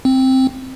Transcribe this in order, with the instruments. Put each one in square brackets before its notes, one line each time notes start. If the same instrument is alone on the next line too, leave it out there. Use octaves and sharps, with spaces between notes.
[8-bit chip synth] C4